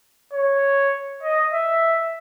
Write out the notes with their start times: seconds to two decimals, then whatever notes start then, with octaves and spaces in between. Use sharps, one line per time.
0.33 C#5
1.23 D#5
1.53 E5